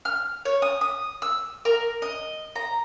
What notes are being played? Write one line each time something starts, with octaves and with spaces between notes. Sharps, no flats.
F6
C#5
D#6
D#6
E6
A#4
D#5
A#5